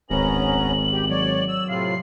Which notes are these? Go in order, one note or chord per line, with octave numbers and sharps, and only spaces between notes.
D1 G#1 B3 C#4 A#5 F#7
G4
F#3 C#5 D5
E6
A2 C3 F4 C7